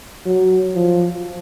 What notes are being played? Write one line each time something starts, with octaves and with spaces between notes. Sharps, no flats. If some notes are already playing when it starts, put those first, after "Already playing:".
F#3
F3